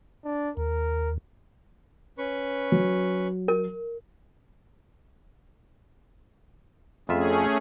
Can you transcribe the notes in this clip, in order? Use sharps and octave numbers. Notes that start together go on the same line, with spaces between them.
D4
D#2 A#4
C#4 B4 C#6
F#3
A#4
F2 A3 C#4 F4 G#4 E5